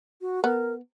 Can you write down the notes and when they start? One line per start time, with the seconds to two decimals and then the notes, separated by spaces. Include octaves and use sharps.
0.21 F#4
0.44 B3 A#4